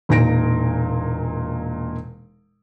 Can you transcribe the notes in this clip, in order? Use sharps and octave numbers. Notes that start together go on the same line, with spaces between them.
E1 A#2 D#4 A#6 D7